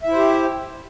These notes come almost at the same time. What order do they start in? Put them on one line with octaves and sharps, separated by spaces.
E5 E4 C5 G4